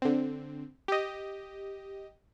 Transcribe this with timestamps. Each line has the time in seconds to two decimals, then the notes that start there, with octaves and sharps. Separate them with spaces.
0.02 D3 C4
0.88 G4 D#5